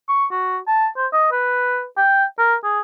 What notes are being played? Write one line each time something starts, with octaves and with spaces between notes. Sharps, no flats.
C#6
F#4
A5
C5
D#5
B4
G5
A#4
G#4